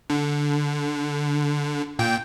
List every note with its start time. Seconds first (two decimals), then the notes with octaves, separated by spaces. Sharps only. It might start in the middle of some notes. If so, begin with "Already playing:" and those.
0.10 D3
1.99 A#2 G5